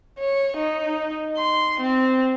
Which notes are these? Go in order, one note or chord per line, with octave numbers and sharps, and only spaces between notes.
C#5
D#4
C6
C4